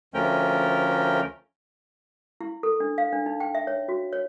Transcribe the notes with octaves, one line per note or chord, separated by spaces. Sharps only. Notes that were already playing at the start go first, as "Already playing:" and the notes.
D2 F3 A3 C#4 A#4 G5
E4
A4
D4
F5
D4
D#4
G5
E5
C#5
F#4
C#5